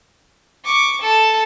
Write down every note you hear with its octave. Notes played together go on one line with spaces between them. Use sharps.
C#6 D6
A4 A5